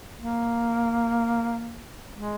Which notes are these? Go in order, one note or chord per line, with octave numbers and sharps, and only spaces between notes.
A#3
G#3